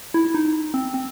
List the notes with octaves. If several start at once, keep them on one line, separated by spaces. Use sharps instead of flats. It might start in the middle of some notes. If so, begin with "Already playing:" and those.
E4
D#4
C4
C4